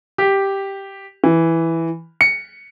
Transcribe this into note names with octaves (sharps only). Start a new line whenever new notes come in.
G4
E3
C#7